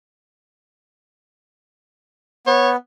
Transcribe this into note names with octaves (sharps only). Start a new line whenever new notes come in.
B3 C#5